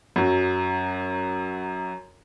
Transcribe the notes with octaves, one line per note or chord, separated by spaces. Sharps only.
F#2 F#3